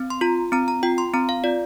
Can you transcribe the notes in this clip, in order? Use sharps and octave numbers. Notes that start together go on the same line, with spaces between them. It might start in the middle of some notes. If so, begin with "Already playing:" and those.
Already playing: C4
C6
F4 A#5
C4 A#5
A#5
F4 G5
C6
C4 A#5
F5
F4 D5